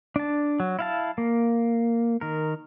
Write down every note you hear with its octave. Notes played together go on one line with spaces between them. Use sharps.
D4 A5
F#3
E4 F5 A5
A#3
D#3 A#4